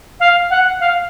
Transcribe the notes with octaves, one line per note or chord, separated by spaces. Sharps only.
F5
F#5
F5